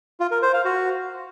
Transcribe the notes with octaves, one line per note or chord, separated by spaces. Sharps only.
F4
A#4
C5
F5
F#4